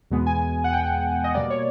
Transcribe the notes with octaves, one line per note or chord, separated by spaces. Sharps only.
E2 B2 G#3 B3
G#5
F#5
G5
D#5
B2 G3 A#3 D5
C#5